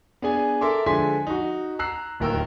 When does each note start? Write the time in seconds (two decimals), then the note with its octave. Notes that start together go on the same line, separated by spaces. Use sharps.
0.22 B3 D4 G#4 G#5
0.61 A4 A#4 E5 C6 D6
0.86 D3 F3 G#3 G#5 C6 B6
1.27 D#4 F#4
1.79 A#5 E6 F#6 C7
2.20 D1 D#2 A#4 G5 E6